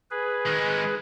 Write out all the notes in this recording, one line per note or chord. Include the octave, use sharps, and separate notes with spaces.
G#4 B4
D#3 G#3